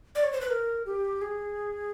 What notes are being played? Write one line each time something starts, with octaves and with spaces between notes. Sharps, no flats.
D5
C#5
C5
B4
A#4
G4
G#4